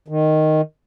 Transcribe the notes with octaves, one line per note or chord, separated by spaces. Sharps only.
D#3